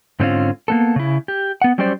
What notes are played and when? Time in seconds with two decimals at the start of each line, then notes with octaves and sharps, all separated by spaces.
0.20 G#2 D3 A3 C4 C#4 F4
0.68 A#3 B3 A4
0.96 C#3 E4
1.28 G4
1.62 B3 F#5
1.78 F#3 G3 C#4 G4 C5 D5